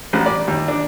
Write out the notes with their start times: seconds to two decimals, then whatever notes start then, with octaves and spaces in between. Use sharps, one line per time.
0.13 A1
0.26 D5
0.48 D#2
0.68 D4